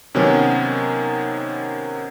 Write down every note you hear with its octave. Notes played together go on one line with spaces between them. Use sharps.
C3 D#3 F#3 B3 C#4